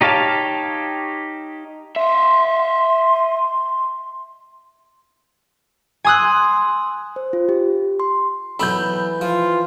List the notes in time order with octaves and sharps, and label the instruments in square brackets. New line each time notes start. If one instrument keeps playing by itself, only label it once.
[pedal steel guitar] D#4 G4 C#5 F5 A5
[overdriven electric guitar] D#5 E5 [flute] C6
[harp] G#5 C6 D#6 E6 F#6
[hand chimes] C5
F4
G4
C6
[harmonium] E3 [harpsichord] F#3 B3 A4 [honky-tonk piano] B5 G6
[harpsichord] F3 [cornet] F4